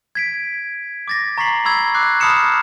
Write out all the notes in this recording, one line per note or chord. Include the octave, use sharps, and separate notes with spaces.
G#6 B6 D7
D6 A6 A#6
A#5 C#6 A6 B6 C7 F#7
B5 C#6 E6 G#6
D6 F#6 C7
A5 B5 D#6 F6 C#7 E7